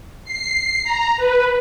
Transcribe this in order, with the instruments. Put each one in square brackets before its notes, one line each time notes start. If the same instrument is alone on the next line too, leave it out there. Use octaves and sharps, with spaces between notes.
[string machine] C7
A#5
B4